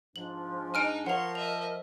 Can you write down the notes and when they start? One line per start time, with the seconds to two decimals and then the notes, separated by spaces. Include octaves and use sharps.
0.16 G#2 F3 D4 F#7
0.74 D#4 G#5 F6 D7
1.06 F3 A#4 C#5 F#5 C6 F7
1.35 D#5 E5 F7